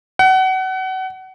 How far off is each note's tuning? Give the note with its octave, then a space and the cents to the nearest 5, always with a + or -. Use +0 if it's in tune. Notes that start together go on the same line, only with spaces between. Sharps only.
F#5 +30